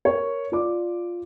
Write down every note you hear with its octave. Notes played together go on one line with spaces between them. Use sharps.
A#4 C#5
F4 D5 D6